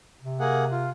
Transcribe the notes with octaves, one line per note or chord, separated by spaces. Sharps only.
C3
A#3 G#4 F#5
F4